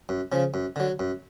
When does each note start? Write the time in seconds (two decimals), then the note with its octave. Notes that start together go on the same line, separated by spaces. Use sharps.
0.09 F#2
0.32 C#3 F3
0.54 F#2
0.76 D3 F#3
0.99 F#2